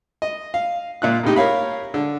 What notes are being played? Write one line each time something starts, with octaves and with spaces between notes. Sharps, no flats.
D#5
F5
A#2 F4 F#6
A2 C3 D#4 G4
A#4 C#5 F5 B5
D3